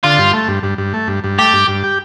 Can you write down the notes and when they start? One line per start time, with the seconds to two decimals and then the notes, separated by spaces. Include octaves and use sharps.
0.03 D3 F4
0.18 G2
0.33 A3
0.48 G2
0.63 G2
0.78 G2
0.94 A3
1.08 G2
1.24 G2
1.39 A3 G4
1.53 G2
1.68 G2
1.84 G4